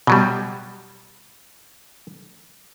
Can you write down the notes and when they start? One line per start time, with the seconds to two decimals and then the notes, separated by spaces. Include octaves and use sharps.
0.07 B2 F#3 G3